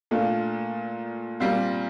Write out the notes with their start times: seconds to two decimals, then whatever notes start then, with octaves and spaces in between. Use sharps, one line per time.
0.11 A#2 A3 D4 F4
1.40 A#2 G3 C4 F4